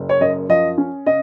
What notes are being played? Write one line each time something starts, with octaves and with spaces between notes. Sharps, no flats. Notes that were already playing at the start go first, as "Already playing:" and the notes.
Already playing: F#1
C#5
F#2 D#5
F3 D#5
C#4
C#3 D#5